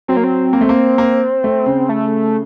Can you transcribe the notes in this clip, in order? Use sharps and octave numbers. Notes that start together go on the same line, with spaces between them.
F#3 C4
A#3
C4
A#3
A3
A#3
A#3
A3
C#3
A3